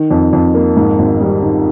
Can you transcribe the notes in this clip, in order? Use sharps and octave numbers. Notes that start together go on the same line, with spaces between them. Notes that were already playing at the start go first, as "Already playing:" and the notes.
Already playing: D#3
F2
F2
A#3
G#2
G#1
G3
D#3